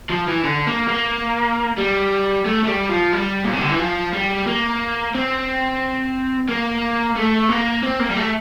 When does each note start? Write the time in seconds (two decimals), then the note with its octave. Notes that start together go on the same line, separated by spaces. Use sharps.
0.09 F3
0.27 E3
0.44 D3
0.67 A#3
0.88 A#3
1.78 G3
2.46 A3
2.64 A3
2.68 G3
2.90 F3
3.13 G3
3.45 A#2
3.53 C3
3.61 D3
3.70 E3
3.79 F3
4.13 G3
4.47 A#3
5.15 C4
6.49 A#3
7.16 A3
7.49 A#3
7.83 C4
7.99 A#3
8.10 G3
8.17 A3